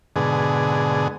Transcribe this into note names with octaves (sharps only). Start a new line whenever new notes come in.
G#2 B2 D3 G#4